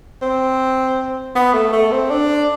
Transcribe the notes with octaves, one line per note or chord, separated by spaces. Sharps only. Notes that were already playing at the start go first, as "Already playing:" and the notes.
C4
B3
A3
A3
C4
D4